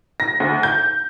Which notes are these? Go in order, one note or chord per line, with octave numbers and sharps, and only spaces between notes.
A#6
D2
G6